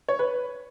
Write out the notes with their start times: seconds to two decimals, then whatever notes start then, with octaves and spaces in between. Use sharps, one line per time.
0.08 C#5
0.19 B4